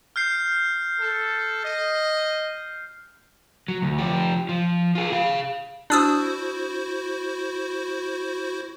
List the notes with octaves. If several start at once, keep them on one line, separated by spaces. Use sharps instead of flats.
F6 G6 C7
A4
D#5
F#3
D2
F3 G4
F3
F4 G#4
G#4 F5
D4 E4 F#4 C5 D#6 E6